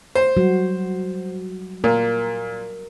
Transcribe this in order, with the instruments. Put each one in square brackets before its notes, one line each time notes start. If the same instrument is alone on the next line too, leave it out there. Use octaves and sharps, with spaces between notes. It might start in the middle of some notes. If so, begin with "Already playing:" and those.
[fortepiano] C5
[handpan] F#3 G3 F#4
[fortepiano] A#2 [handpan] A#4